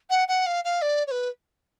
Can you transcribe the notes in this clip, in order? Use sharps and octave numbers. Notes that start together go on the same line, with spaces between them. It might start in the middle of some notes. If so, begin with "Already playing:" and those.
F#5
F#5
F5
F5
D5
C#5
B4